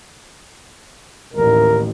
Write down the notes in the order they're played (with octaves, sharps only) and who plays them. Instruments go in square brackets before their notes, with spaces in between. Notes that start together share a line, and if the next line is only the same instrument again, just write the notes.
[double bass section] A1 D#2 [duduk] A#4